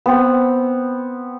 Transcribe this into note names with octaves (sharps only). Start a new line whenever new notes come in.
B3 C4